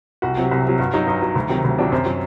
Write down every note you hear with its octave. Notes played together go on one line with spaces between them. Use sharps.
C2 F#4
C3 F#3
C2
C3 F#3
G2 F#4
F#3 D#4
G2 D#4
F#3
D2
C3 D#3 F#3
D2
C3 D#3 F#3 D4
F#2 C4
F#3